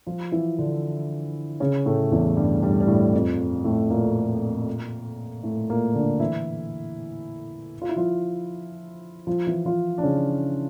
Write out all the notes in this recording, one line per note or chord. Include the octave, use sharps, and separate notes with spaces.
F3 F4
E3 E4
D3 D4
C#3 C#4
A2 A3
E2 E3
G2 G3
G2 G3
G3
A2 A3
F2 F3
A2 A3
A#2 A#3
A2 A3
A#2 A#3
D3 D4
E3 E4
F4
E4
F3 F4
F3 F4
E3 E4
F3 F4
D4
C#3 C#4